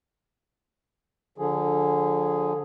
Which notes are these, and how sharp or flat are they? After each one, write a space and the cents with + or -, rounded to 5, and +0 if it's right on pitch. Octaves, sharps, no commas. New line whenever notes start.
D3 +0 F3 +35 G#4 +0